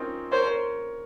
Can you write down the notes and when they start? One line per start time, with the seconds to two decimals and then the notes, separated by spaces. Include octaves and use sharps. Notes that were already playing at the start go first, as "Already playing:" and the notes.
Already playing: A#3 C4 C#4 D#4 F4
0.32 A#4 C5 C#5
0.46 A#4 C#5